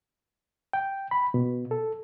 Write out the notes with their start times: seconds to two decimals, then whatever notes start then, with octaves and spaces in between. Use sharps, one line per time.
0.73 G5
1.11 B5
1.34 B2
1.71 A4